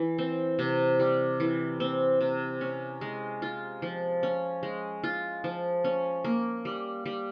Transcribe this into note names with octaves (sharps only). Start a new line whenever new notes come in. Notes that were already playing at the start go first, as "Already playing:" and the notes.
Already playing: E3
C4
C3
G3
E3
C4
C3
C#4
G#3
F4
F3
C#4
G#3
F4
F3
C#4
A#3
G3
G3